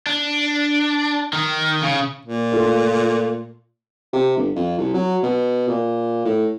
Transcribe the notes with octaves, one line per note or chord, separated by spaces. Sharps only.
D4
D#3
C#3
A#2
A3 F4
C3
G1
F2
C2
F#3
B2
A#2
A2